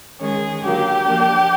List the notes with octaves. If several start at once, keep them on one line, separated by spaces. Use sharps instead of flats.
D#3 G#3 C#4 G#4
D3 F#3 A#3 G4
F3 A#3 D4